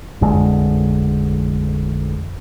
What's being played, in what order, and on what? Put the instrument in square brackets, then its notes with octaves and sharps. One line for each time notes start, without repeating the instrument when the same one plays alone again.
[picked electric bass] A1 F2 D3 G#3